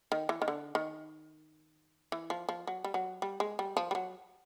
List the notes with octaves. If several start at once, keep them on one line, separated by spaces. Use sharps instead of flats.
D#3
E3
D#3
D3
D#3
E3
F3
F3
F#3
G3
F#3
G3
G#3
G3
F3
G3
F#3